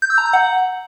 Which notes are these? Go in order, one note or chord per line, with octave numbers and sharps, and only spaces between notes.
G6
E6
A#5
G6
F#5